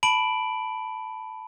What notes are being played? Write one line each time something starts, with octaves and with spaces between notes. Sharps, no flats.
A5 B5 D7 F#7